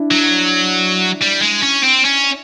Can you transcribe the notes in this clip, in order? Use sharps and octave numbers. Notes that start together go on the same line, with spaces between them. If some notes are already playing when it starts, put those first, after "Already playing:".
Already playing: D4 E4
F#3
G3
G#3
C#4
C4
C#4